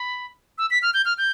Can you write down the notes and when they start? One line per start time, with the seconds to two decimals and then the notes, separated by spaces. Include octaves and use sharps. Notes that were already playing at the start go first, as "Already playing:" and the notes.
Already playing: B5
0.58 E6
0.71 B6
0.82 F6
0.94 G6
1.05 F6
1.18 G6